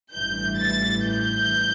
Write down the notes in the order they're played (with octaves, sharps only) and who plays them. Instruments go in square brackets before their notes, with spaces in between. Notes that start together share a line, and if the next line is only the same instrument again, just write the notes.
[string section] A1 G2 E3 G6
A6
G6